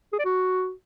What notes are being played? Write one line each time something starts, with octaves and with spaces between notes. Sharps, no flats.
G#4
D5
F#4